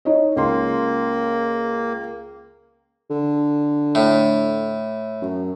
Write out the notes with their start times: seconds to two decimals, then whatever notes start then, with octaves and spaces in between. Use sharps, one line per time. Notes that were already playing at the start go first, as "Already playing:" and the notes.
0.05 D#4 C#5 D#5
0.36 C#2 A#3 C6
3.10 D3
3.95 A2
5.21 F#2